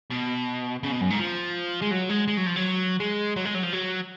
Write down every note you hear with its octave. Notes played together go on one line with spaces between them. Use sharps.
B2
C#3
B2
F#2
G#2
F3
G#3
F#3
G#3
G#3
F#3
F3
F#3
G#3
F#3
G#3
F#3
F3
F#3